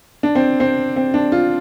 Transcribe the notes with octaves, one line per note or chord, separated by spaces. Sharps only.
D4
C4
C4
C4
D4
F4